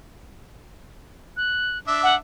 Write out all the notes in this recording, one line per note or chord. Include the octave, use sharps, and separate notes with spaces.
F#6
D4 E5
F#5